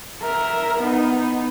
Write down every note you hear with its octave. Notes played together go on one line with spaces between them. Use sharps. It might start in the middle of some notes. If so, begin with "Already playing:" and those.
A#4 E5
B3 D#4